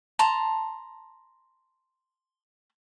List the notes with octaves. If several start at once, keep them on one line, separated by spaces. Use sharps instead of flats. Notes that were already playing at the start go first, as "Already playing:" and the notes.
A5 A#5 C6